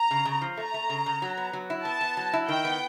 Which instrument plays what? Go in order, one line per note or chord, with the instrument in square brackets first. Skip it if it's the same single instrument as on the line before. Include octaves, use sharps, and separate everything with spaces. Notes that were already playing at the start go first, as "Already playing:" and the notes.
Already playing: [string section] A#5
[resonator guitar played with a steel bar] C#3
C#3
F3
[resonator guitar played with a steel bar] A3 [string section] A#5
[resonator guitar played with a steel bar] A3
C#3
C#3
F#3
B3
F#3
E4
[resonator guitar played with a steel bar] B3 [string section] A5
[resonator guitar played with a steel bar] B3
F#3
E4
[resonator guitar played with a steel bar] D#3 [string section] G5
[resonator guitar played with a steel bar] B3